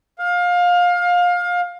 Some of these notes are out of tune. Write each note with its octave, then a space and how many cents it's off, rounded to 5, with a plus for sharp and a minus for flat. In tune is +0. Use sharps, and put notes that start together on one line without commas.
F5 +25